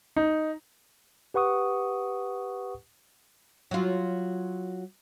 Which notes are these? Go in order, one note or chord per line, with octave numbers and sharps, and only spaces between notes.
D#4
G4 B4 F#5 C#6 D#6
F#3 F4